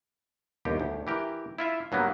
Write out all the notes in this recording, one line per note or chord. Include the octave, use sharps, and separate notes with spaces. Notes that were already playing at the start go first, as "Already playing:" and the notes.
G1 D#2 G4
D2
E3 G4 A#4
E4 F4 E5
G2 F#3 A#3 B3